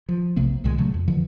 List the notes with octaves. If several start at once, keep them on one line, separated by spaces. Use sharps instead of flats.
F3
B1 C3 A3 B3
C2 A#2 D#3 G#3
C#3 F#3 A3
F2
D3 E3 F3